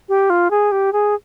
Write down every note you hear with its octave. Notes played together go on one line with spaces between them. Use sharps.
G4
F4
G#4
G4
G#4